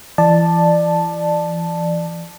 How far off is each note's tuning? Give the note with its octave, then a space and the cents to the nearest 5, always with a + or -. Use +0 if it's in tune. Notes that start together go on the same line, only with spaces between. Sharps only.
E3 +35 D5 +20 A5 +0